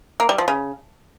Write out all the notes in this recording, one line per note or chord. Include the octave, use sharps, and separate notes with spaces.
A#3
G3
F3
C#3